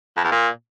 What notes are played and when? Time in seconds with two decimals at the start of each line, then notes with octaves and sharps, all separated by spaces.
0.17 F2
0.24 E2
0.32 A#2